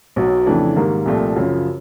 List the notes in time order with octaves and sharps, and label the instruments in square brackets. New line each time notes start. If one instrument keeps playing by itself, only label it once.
[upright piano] B1 B2 F#3
F2 C#3 E3 A3 D4
G#2 D#3 G3 A#3
C2 A#2 F3 A3
F#2 C#3 F3